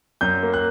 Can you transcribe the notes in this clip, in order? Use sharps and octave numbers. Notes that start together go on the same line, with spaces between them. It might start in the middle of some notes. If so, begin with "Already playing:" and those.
F#2 G6
A#3
F#6